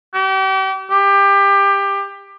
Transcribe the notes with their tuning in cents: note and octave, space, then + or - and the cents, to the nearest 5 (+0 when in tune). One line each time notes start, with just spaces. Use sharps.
G4 -40
G4 +20